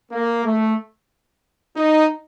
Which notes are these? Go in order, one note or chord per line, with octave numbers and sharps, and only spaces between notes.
A#3
A3
D#4